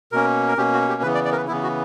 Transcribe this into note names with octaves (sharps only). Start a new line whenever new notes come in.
B2 A#3 C#4 A#4
A#4
B2 A#3 C#4 G4
F#4
G4
C#3 E3 B3 B4
D5
D5
A#4
B4
C#3 E3 B3 E4
F#4